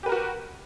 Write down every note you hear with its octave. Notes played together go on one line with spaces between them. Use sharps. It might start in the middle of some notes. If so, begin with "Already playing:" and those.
F#4 G4 A#4 B4